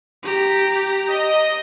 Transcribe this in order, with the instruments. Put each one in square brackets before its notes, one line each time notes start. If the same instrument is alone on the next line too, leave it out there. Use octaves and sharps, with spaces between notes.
[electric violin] G4 A#5
[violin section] D#5